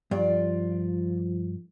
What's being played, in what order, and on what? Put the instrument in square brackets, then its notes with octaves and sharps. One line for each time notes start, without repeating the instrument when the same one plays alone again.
[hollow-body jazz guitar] G2 [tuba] F3 [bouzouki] D4 F4 D5